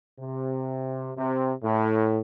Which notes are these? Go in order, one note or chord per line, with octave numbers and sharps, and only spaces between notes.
C3
C3
A2